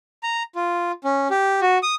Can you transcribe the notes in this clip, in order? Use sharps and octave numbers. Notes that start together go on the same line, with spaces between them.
A#5
F4
C#4
G4
F#4
D#6